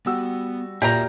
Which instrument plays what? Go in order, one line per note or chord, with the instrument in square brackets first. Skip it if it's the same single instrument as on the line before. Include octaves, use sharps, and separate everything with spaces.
[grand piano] G3 F#4 E6 [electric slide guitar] B3
[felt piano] A#2 [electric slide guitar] F#4 E5 [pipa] G4 G5 A#5